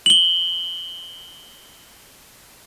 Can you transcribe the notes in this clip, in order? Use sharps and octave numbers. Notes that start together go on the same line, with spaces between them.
F#7 G7